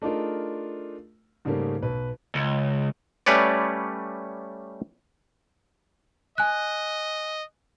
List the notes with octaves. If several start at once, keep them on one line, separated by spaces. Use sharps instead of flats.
A3 D4 D#4 F4 G#4 A#4
G#2 C#3 G3 A3 A#3 C#4
B1 B4
C#2
G3 A3 C#4 B4 C#5 D5
D#5 G#5 F#6